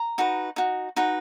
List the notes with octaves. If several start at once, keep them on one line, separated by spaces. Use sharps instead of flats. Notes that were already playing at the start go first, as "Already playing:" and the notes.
Already playing: A#5
D#4 F#4 B4
D#4 F#4
D#4 F#4 B4